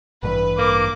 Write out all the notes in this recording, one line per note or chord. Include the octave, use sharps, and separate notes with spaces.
A1 G2 E3 B4
A#3 D6